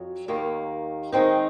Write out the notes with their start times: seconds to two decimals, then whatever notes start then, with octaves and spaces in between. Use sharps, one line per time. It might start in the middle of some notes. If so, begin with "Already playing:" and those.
Already playing: F2 F#3
0.28 D#2 D#3 A#3
1.12 D#3 G#3 C4 D#4